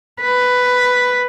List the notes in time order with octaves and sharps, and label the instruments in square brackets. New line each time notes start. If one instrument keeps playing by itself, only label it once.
[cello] B4